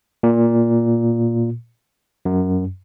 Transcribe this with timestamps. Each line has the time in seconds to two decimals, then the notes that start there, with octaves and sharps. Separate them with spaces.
0.23 A#2
2.25 F#2